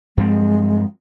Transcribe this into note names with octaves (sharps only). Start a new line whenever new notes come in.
G2 F3 G#3 C4